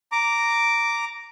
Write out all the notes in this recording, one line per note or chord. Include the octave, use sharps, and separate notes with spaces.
A#5 D6